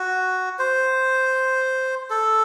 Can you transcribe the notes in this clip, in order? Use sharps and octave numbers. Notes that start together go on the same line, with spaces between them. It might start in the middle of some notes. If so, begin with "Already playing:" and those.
Already playing: F#4
C5
A4